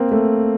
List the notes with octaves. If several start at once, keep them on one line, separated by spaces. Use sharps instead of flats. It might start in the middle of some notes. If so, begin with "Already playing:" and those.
Already playing: A#3 C4
A3